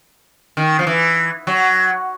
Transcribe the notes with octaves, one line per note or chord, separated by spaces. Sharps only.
D#3
F3
E3
F#3